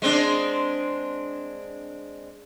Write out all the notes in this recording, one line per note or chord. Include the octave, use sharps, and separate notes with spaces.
G#3 C4 D4